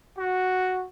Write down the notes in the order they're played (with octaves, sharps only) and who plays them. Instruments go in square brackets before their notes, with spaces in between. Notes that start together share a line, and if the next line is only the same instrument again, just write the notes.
[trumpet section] F#4